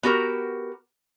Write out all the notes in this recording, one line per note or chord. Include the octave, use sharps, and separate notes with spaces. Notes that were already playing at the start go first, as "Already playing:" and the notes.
B3 F#4 G4 A#4